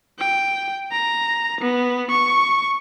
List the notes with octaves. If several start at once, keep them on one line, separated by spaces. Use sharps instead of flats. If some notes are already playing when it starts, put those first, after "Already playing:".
G5
A#5
B3
C#6